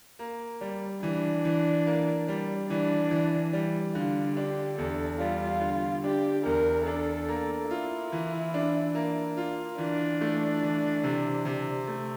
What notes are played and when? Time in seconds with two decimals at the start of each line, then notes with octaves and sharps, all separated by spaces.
0.19 A#3
0.61 G3
1.03 E3 D4
1.45 E3
1.86 A#3
2.28 G3
2.69 E3 D4
3.11 E3
3.53 G3
3.95 D3 F4
4.36 D4 G4
4.78 E2 A4
5.20 G3 F4
5.61 D3
6.04 D4 G4
6.45 E2 A#4
6.86 D4 A4
7.28 A#3
7.71 E4 F4
8.12 E3
8.54 D4
8.95 A#3
9.37 F4
9.78 E3 D4
10.21 A3
10.63 E3
11.03 C3
11.45 C3
11.88 A3